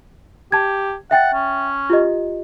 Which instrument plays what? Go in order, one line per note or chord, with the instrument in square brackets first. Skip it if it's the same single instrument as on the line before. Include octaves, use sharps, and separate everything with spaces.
[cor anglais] G4 [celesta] A5 G#6
[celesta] E5 G5 A6 [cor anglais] F#5
[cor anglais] C#4
[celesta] F4 G4 D#5